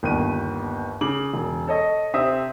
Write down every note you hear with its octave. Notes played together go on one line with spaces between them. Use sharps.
G1 D#2 B3 D#7
C#3 D6 F#7
E1
A4 C#5 D#5
C3 C4 E5 D#6